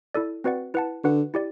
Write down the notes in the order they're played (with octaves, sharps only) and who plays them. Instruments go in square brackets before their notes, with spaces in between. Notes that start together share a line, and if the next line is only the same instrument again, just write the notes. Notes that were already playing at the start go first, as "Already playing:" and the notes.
[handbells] E4 A4 D5
C4 F#4 B4 D5 F#5
E4 B4 F#5 A5
[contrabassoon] D3 [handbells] F#4 B4 F#5
[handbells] E4 G4 D5